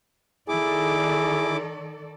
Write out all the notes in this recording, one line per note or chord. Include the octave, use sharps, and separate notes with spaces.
D#3 E4 G#4 A4 D5 D6